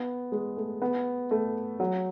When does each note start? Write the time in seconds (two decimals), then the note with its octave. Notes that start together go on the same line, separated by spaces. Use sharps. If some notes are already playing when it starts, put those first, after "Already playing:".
Already playing: B3
0.32 G#3
0.57 A3
0.82 B3
1.31 A3
1.80 F#3